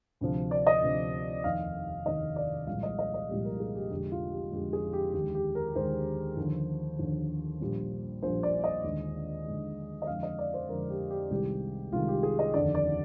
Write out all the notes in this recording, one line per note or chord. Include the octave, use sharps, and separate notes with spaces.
D2 C3 F3
D5
D#5
D2 C3 F3
F1 D#2 D#3 F5
F1 D#2 D#3 D#5
D5
C2 A#2 F3 G#3 F5
D#5
D#5
D#5
C2 A#2 F3 G#3 G4
A#4
G#4
G4
F1 F2 D3 F3 G#3 G4
F4
G4
F1 F2 D3 F3 G#3 G4
G#4
G4
D#2 D3 G#3 G4
G4
A#4
D#2 D3 G#3 C5
D#2 D3 F3
D#2 D3 F3
A#1 A#2 G3
A#1 A#2 G3 C5
D5
D#5
D#2 D3 G#3
D#2 D3 G#3
D#5
F2 D3 G#3 F5
D#5
D5
C5
F2 D3 G#3 A#4
G4
G4
C2 C3 D#3 G#3 G4
C2 C3 D#3 G#3 F4
G4
G#4
D#5
F1 D#2 D3 D5
D5